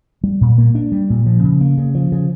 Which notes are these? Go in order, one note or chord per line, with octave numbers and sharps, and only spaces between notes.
G3
A#2
A#3
D4
G3
A#2
F3
C#3
A#3
C#3
F3
C#3